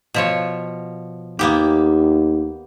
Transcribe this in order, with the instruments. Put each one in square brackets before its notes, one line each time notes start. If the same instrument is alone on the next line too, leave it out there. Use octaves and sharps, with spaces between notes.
[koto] B2 F3 C#5
[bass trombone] D#2 [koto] A#3 B3 G4